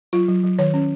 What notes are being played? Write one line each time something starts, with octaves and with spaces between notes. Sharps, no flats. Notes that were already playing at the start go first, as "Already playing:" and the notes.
F#3 F4
F#3
F#3
D#3 C#5
C#4